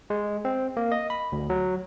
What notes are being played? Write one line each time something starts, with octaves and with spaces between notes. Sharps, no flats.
G#3
C4
A#3
D#5
B5
D2
F#3